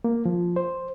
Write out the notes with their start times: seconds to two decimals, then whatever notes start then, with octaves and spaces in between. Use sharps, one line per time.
0.04 A#3
0.26 F3
0.56 C5